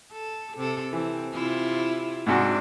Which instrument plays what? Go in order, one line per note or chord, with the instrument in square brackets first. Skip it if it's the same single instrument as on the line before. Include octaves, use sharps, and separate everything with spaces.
[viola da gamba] A4
C3 A4
[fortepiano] E3 [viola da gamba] C4
[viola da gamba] C3 E4 F4
[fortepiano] G#2 C3 F#4 [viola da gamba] D4